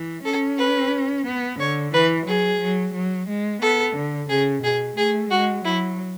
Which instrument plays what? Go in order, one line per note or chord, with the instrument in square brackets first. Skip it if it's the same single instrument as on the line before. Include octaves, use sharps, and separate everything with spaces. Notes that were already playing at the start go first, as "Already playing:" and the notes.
Already playing: [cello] E3
[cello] C#4 [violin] A4
[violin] B4
[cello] B3
[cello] D3 [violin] C#5
[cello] E3 [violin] B4
[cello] F#3 [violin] G#4
[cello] F#3
F#3
G#3
[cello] B3 [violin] A4
[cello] D3
[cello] C#3 [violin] G#4
[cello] B2 [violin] G#4
[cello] A3 [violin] G#4
[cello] G#3 [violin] F#4
[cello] F#3 [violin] E4